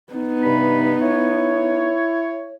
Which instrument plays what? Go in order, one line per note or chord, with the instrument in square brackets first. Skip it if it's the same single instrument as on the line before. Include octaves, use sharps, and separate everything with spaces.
[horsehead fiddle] B3 D#4
[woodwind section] G2 C3 B5
E4 C#5